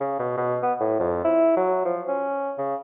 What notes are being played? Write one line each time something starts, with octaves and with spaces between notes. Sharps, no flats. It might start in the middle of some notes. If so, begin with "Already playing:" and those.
C#3
B2
B2
B3
A2
F2
E4
F#3
F3
C#4
C#3